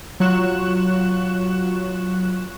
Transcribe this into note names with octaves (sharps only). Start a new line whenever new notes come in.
F#3 F4 C#6 F#6 E7